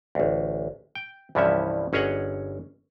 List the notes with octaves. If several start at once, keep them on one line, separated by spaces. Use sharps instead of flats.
A1 D2
G5
C2 G2 E3 F3 C#4 E5
G1 C#4 G#4 C#5 D#5 F#5